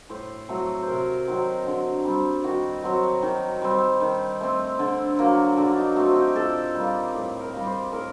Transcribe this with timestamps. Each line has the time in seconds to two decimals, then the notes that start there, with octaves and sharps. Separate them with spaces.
0.10 A2 C5
0.48 F#3 A3 C4
0.82 C3 A#4 C5
1.27 D#3 F#3 C4
1.66 D3
2.05 G3 C4
2.44 D#3 F#4
2.83 F#3 C4
3.23 D#3
3.62 G3 C4
4.01 D#3
4.41 A3 C4
4.79 D3
5.19 F#3 A#3
5.57 D3 D4
5.72 D4
5.77 D#4
5.96 A3 C4 F#4
6.08 F#4
6.16 G4
6.35 A#2 A4
6.75 G3 A#3
7.14 A2 G4
7.40 A#4
7.53 G3 A#3
7.67 C5
7.92 A2 A#4